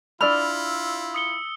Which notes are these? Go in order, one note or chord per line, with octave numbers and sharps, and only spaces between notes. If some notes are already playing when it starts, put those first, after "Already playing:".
D4 E4 F4 D5 B5 E6 F6
D#6 C#7 G7